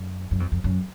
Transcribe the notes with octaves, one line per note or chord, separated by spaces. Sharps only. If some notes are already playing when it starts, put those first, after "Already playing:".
Already playing: F#2
F#2
F2
F2
F#2